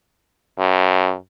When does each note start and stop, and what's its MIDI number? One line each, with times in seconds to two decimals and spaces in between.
0.59 1.13 42